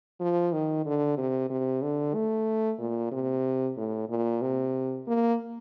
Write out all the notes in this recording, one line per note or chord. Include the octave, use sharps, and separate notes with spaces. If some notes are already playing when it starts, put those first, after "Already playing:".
F3
D#3
D3
C3
C3
D3
A3
A#2
C3
A2
A#2
C3
A#3